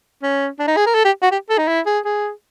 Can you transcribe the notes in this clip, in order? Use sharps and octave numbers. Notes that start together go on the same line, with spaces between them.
C#4
D4
D#4
G#4
A#4
A4
G4
F#4
G4
A4
D#4
E4
G#4
G#4